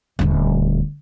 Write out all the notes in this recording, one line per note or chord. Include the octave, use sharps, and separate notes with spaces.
D#1 D2